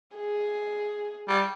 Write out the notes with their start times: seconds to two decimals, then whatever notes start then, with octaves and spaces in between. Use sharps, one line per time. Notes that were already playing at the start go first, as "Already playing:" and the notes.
0.16 G#4
1.28 G3